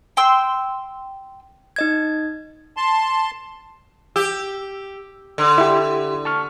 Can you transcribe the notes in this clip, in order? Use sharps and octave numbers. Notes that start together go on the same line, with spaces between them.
G5 C6 E6
D#4 D#5 G#6
A5 C6
G4 E6
D3
E4 G4
A5 C#6 F6